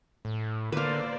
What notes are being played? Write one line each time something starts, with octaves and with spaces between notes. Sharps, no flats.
A2
D3 A#3 B4 C5 D5 F5